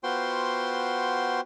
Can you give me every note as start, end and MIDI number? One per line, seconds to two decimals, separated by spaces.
0.03 1.41 59
0.03 1.41 65
0.03 1.41 66
0.03 1.41 72
0.03 1.41 79
0.03 1.41 84